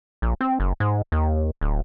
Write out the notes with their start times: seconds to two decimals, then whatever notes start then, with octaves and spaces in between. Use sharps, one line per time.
0.22 A#1
0.41 C4
0.60 F#1
0.80 G#2
1.12 D#2
1.61 D1